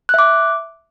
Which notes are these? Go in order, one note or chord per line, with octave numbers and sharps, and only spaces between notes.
E5 D6 F#6